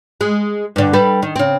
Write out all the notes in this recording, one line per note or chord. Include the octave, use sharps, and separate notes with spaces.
G#3
G2 D3
G3 A4 B4
D#3
C#3 C4